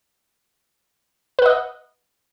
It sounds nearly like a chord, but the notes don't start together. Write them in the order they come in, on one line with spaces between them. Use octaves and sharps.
B4 F#5 D#5